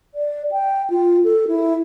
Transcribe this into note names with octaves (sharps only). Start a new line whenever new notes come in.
D5
G5
F4
A4
E4